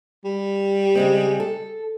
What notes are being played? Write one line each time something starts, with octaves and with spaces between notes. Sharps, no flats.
G3
C#3 G#3 C4
A4